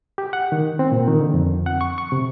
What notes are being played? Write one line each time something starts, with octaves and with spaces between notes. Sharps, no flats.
G4
F#5
D#3
C4
A#2
D#3
D3
F2
F#5
C#6
C#6
C3